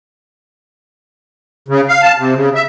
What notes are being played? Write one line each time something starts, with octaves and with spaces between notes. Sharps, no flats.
C#3
F5
A5
C3
C#3
E5